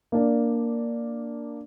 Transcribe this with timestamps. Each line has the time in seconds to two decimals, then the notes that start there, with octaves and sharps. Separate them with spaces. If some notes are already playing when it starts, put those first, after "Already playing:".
0.12 A#3 D4